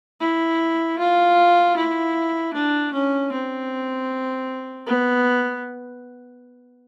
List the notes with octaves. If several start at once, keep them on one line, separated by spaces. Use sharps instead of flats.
E4
F4
E4
D4
C#4
C4
B3